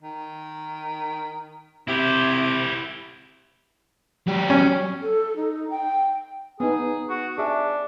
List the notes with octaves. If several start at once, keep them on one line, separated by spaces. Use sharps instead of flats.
D#3
C3 E4 G4
F#3 G4
C#4
A4
D#4
G5
B3 D#4 G#4
F#4
D4 G#4 E5